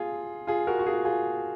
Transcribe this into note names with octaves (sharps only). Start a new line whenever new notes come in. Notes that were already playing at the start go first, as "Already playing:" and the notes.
Already playing: F4 G#4
F4 G#4
F#4 A#4
F#4
F4 G#4
F4 G#4